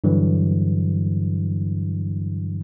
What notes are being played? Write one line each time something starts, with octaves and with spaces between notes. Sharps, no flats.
G2 D3 E3 F#3